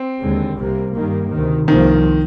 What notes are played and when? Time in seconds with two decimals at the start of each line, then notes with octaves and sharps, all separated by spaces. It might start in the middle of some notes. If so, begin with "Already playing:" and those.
Already playing: C4
0.21 D#2 D3 G#3
0.58 C2 C3 G3 A#3
0.94 G2 D#3 G3 A#3
1.31 D2 C3 D#3
1.68 C2 C3 D#3 F3 A#3